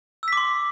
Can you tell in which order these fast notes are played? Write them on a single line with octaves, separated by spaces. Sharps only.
E6 B6 D6 C6